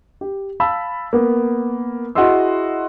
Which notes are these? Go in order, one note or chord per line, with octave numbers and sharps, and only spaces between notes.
G4
F5 A5 B5 E6
A#3 B3
E4 F#4 G#4 D#5 C6 E6